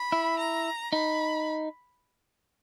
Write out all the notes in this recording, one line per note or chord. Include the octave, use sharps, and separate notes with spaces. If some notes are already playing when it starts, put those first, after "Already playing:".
Already playing: B5
E4
A#5
D#4 B5